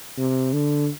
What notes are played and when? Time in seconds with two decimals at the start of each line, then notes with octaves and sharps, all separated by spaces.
0.18 C3
0.53 D3